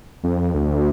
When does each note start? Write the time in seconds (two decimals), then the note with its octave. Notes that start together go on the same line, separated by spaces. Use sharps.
0.24 F2
0.54 D2